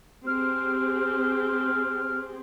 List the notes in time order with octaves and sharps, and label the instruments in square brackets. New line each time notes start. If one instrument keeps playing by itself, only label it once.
[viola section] C4 G4 G#4 [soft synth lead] F6